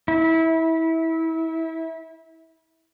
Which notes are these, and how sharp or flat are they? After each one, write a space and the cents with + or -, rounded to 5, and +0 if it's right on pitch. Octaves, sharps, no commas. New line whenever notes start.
E4 -25